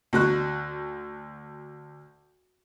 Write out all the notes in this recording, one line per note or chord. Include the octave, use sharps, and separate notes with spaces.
D2 F#4 F#6